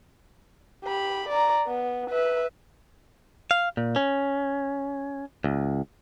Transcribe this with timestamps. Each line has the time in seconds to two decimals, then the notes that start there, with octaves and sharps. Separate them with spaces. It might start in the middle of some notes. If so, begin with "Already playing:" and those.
0.84 G4 B5
1.29 D5 A#5
1.67 B3
2.10 B4 E5
3.51 F5
3.77 A#2
3.96 C#4
5.44 C#2